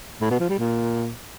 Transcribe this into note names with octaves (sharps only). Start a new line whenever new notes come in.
A2
B2
F3
G3
A#2